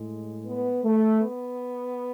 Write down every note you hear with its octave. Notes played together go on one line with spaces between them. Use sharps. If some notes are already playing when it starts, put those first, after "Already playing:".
Already playing: A2 G#3
B3
A3
B3